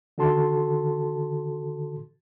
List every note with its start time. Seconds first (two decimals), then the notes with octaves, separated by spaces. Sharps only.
0.18 D3 D#3 F#4 A4 A5 C6